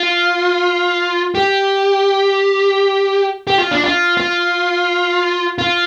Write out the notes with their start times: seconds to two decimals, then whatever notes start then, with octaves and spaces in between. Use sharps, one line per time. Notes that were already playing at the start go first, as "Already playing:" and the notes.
Already playing: F4
1.35 G4
3.47 G4
3.59 F4
3.71 D4
3.84 F4
4.17 F4
5.58 F4